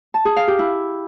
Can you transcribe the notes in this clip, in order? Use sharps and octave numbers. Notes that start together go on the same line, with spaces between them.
A5
G#4
F5
G4
E4